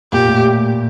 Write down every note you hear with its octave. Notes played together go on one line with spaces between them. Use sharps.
A#2 G4
A2